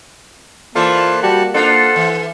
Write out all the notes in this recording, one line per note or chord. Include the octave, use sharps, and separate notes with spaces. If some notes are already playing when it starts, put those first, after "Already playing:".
E3 A#3 F4 A4 C5 D5 A5
G3 F#4 G4 A5
D4 F4 A4 C5 F#5
E3